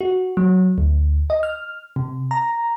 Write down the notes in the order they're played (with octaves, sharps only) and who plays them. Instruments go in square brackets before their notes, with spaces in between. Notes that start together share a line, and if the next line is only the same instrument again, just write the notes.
[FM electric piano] F#4
F#3
D2
D#5
F6
C3
A#5